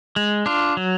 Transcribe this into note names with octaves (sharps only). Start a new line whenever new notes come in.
G#3
D4 F4
F#3